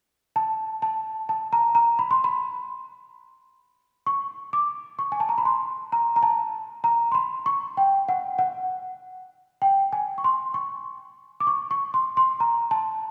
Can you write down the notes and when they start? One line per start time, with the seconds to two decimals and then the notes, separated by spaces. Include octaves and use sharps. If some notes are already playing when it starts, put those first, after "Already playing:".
0.36 A5
0.82 A5
1.29 A5
1.53 A#5
1.75 A#5
1.99 B5
2.11 C6
2.24 B5
4.06 C#6
4.53 D6
4.99 C#6
5.12 G#5
5.20 A5
5.29 A#5
5.38 B5
5.45 C6
5.92 A#5
6.16 A#5
6.23 A5
6.84 A#5
7.12 C6
7.15 B5
7.46 C#6
7.77 G5
8.09 F#5
8.39 F#5
9.62 G5
9.93 G#5
10.18 C#6
10.24 C6
10.54 C#6
11.40 D6
11.47 C#6
11.71 C#6
11.94 C6
12.17 C6
12.40 A#5
12.71 A5